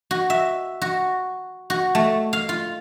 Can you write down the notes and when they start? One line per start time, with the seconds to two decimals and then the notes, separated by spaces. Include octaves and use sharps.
0.11 F#4
0.30 E5
0.82 F#4
1.70 F#4
1.95 A3
2.33 F5
2.49 F4